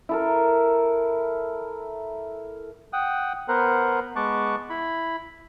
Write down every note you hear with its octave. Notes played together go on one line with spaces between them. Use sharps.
E4 A4 A#4
F#5 G5 D#6
B3 A#4 C5 F#5
G#3 B3 A5 C#6 D6 F#6
E4 B5